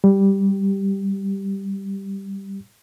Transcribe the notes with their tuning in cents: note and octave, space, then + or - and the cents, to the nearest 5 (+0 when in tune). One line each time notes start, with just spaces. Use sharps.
G3 +0 G4 -5